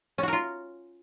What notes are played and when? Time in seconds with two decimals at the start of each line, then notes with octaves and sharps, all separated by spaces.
0.18 C#4
0.23 F#4
0.28 A#4
0.33 F4